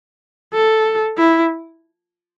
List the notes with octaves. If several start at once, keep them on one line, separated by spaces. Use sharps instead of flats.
A4
E4